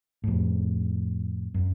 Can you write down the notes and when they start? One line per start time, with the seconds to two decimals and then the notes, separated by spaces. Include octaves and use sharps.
0.24 F2 A2
1.54 F#2